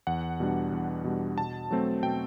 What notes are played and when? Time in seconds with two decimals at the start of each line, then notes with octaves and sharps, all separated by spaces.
0.07 E2 F#5
0.40 B2 G3 D4
0.72 E2
1.04 B2 G3 D4
1.38 B2 A5
1.71 F#3 A3 C4
2.03 B2 G5